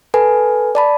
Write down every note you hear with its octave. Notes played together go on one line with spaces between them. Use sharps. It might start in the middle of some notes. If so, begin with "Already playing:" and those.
A4 B4 G#5
D5 A5 B5